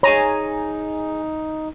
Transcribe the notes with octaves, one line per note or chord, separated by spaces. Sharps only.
D#4 G#4 C#5 G#5 A#5